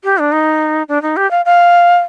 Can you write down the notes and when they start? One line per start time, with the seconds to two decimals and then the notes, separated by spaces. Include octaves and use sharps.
0.04 G4
0.18 D4
0.32 D#4
0.89 D4
1.02 D#4
1.17 G4
1.31 F5
1.45 F5